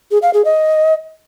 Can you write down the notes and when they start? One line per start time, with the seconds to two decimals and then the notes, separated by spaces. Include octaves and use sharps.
0.11 G#4
0.22 F5
0.34 G#4
0.45 D#5